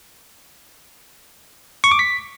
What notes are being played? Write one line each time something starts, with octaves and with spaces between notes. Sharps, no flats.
C#6
D6
B6